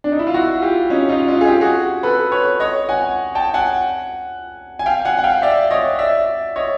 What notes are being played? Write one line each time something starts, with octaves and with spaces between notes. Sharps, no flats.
D4
D#4
E4
F4
E4 F#4
F4 G4
C#4 D#4
D#4 F4
D#4 F4
G#4
F4 G4
F#4 G#4
A4 B4
B4 C#5
C#5 D#5
F#5 G#5
G5 A5
F#5 G#5
G#5
F5 G5
F#5 G#5
F#5
F5 G5
D5 E5
C#5 D#5
D5 E5
C#5 D#5